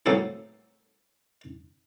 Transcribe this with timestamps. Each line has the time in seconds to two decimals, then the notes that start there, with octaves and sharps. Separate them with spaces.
0.06 A2 F#3 A#3 C4 G#4 A4